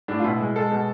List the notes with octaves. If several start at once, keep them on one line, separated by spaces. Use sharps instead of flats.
A2 D4
F4
B2 E4
G#3
G#3 A4
B2